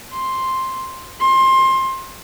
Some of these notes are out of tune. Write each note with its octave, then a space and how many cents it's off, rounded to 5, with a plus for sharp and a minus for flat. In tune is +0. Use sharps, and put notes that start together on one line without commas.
C6 +5
C6 +25